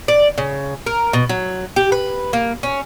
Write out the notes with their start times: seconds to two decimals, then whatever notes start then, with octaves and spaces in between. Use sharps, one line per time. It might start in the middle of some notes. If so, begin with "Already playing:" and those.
0.08 D5
0.38 C#3
0.86 A#4
1.13 B2
1.29 F#3
1.76 G4
1.92 B4
2.33 A#3
2.63 C#4